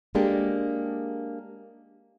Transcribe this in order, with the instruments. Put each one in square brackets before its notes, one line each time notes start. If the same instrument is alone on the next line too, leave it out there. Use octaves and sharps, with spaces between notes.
[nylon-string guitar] G#3 A#3 D4 G4 A4